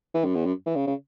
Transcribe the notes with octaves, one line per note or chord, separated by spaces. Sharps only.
E3
F#2
E2
F#2
E3
C#3
C#3